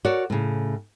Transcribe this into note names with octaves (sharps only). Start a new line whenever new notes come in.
F#4 A#4 C#5 D5
A2 C#3